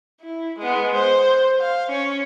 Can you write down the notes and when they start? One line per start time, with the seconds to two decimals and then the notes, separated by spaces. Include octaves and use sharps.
0.21 E4
0.59 G#3 B3
0.95 C5
1.60 F5
1.89 C#4 C#5